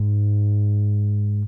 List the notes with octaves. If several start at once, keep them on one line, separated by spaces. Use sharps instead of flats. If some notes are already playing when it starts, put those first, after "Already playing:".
Already playing: G#2